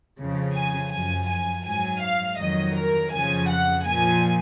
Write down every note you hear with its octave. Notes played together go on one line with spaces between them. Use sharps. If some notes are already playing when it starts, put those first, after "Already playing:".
F2 C#3 F3
G#5
F#2 F3 G#5
G#5
G#2 F#3 G#5
F5
F2 D#3 F#3 D#5
A#4
F2 C#3 F3 G#5
F#5
A#2 F3 G#5